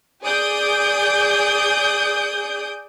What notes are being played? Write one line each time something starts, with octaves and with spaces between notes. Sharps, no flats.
G#4 D5 D#6 G6 D7